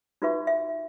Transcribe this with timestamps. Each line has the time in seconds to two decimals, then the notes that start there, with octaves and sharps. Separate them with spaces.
0.22 D#4 F4 F#4 B4 E5 C#6
0.47 E5